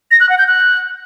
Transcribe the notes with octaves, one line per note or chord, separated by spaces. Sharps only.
A#6
F#6
F#5
G6
F#6